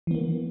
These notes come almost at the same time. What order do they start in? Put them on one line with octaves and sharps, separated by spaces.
E3 B3 A#3